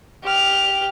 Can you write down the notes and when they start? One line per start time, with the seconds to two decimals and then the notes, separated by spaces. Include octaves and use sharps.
0.23 G4 F6